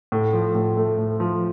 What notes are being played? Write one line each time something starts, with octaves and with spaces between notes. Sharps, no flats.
A2
F3
A2
A3
A2
F3